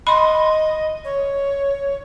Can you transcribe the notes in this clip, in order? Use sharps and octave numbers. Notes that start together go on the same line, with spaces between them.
D#5 B5 C6
C#5